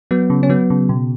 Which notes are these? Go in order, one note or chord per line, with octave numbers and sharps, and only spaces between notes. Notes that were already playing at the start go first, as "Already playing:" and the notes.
F#3 B3
C#3
C#4
F#3 B3
C#3
B2